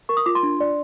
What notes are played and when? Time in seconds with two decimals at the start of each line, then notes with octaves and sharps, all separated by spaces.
0.09 A#4 C#6
0.17 D#6
0.26 F4 D6
0.35 C6
0.43 D4
0.60 D5